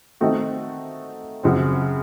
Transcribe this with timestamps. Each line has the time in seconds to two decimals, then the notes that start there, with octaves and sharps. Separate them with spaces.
0.21 D#3 A3 C4 D#4 F#4
1.43 F#2 C#3 F#3 C4